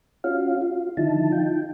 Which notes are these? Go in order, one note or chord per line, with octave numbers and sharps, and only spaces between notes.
C#4 F4 F#4 F5
F4
D3 D#3 F3 D#4 E4 A5
D#4 F4 G5